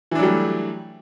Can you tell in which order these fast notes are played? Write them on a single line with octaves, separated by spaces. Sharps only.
E3 D4 F#3 G3 A3